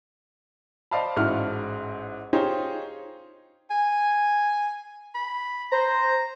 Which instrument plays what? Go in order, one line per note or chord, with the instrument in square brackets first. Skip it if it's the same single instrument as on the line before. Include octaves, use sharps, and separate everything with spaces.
[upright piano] C5 D5 D#5 F5 A5 B5
A1 G#2 E4 F#4 F#5 F6
D#4 F4 G4 G#4 C5 C#5
[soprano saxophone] G#5
B5
[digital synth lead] C5 [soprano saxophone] A#5